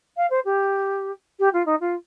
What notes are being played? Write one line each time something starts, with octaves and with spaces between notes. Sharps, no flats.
F5
C5
G4
G4
F4
D#4
F4